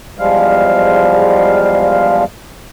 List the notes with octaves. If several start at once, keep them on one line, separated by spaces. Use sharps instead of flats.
E2 F3 G3 G#3 F5